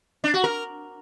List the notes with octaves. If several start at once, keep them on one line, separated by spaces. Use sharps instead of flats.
D4
F#4
A#4